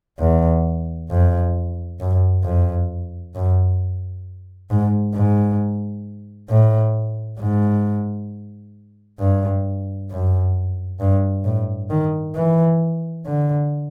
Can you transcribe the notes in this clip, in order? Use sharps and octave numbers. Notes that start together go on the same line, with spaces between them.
E2
F2
F#2
F2
F#2
G#2
G#2
A2
G#2
G2
F#2
G2
A2
D#3
E3
D3